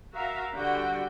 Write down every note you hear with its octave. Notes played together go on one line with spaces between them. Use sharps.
F#4 A#4 E5 F5 A#5
D3 G3 F#4 G5